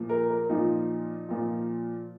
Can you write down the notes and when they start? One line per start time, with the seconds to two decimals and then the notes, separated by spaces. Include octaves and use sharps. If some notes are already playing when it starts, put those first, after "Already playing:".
Already playing: A#2 F3
0.09 A#4
0.30 A#4
0.49 A#2 F3 D#4
1.29 A#2 F3